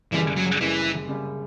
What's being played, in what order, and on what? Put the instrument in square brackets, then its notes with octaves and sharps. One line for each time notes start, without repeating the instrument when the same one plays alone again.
[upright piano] F#1 F#2 C#3 G3 [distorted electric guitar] E3
[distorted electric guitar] F#3
[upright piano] F#1 F#2 C#3 G3 [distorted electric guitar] E3
[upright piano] F#1 F#2 C#3 G3